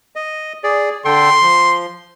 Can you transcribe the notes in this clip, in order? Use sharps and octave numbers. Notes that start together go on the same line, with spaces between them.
D#5
G#4 D5
D3 A4 G5 C6
F3